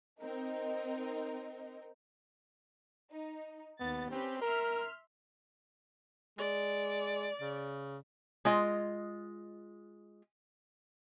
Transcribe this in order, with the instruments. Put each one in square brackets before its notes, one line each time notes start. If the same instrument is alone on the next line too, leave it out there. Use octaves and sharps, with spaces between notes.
[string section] C4 D#4 A#4
D#4
[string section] D#2 A6 [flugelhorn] B3
[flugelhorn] C4 [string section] C#4 G4 B4
[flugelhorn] A#4 [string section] E5 C6 F6
[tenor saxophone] G#3 [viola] D5
[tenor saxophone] C#3
[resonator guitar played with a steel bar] G#3 F4 D#5